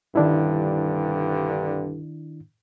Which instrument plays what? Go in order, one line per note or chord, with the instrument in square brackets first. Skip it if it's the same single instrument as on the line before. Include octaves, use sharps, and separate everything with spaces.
[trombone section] C2 G2 D3 [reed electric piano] D#3 D4 E4